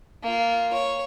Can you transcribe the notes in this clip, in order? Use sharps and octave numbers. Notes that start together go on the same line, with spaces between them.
A#3 F4
C#5